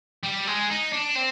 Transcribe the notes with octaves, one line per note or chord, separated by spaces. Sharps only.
G3
G#3
D#4
D4
C4